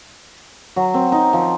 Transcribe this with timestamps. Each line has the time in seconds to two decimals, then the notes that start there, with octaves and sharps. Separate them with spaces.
0.76 F#3
0.94 C4
1.12 D#4
1.33 F3